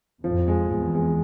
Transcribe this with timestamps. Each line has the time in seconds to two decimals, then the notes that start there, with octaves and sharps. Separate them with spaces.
0.24 F2 F3
0.48 G#3
0.71 E2 G#3
0.95 G#3